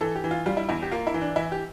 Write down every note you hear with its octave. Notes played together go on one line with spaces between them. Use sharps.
E3 A4
G4
E3
F4
G3 F4
E4
E2 E4
G4
A#3 F4
E4
E3
D4
E3 E4
G4